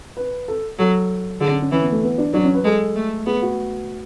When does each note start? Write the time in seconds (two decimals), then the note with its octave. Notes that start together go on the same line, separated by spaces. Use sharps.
0.17 B4
0.48 A4
0.79 F#3 A4
1.41 D3 G#4
1.51 C#4
1.61 C#4
1.72 E3 C#4
1.82 B3
1.92 A3
2.03 B3
2.18 D4
2.33 F#3 D4
2.44 C#4
2.55 B4
2.64 G#3 A4
2.96 A3
3.26 B3 G#4
3.42 F#4